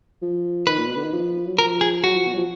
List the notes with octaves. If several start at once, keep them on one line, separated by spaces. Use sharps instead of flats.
F3
D#3 B4
A#2
B2
D3
D#3
F3
F#3
F3 A#4
G#4
F#3 F#4
F3
B2
F#3
F3